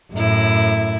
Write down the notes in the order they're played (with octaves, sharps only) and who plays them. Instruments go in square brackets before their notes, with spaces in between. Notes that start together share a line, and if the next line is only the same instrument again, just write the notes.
[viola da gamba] F#2 A2 E4